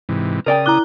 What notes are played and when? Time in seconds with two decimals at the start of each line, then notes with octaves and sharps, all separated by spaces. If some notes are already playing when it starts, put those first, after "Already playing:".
0.09 G#2 C3 E3
0.46 C#3 A#4 D5 G5 D#6
0.66 E4 A#5 D6 F#6 G7